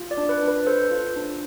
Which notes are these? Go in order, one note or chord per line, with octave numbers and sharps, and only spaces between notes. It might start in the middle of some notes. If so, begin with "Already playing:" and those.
Already playing: F4
D5
D4
B4
D4
B4
A4 C5
F4
D4